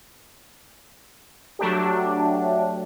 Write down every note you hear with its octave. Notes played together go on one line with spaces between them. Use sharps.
F#3 A3 D4 G4